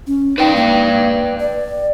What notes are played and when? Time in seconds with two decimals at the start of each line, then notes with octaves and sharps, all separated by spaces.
0.07 C#4
0.38 D#4 B4 D5 G5
0.56 A#3
1.40 D5